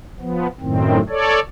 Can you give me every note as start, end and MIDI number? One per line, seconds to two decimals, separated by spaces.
0.20 0.47 53
0.20 0.47 59
0.61 1.00 42
0.61 1.00 45
0.61 1.00 51
0.61 1.00 60
1.09 1.40 69
1.09 1.40 73
1.09 1.40 74